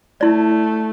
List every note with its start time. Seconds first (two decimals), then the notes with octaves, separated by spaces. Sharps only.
0.21 A3 E4 D5